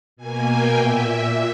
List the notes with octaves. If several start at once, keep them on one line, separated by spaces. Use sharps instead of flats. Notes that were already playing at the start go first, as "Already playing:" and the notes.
B2 A#3 G#5
G5
A#2 E5